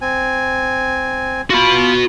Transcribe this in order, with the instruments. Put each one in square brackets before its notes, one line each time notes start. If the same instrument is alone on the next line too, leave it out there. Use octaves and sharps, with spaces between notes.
[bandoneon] C4 G#5
[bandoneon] F4 [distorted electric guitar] F#4 B5